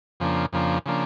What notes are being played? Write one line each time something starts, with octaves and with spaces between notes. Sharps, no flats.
F2 C#3 F3 A#3 D4
F2 C#3 F3 A#3 D4
C#3 F3 A#3 D4